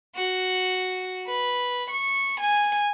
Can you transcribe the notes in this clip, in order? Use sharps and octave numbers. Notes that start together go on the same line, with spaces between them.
F#4
B4
C#6
G#5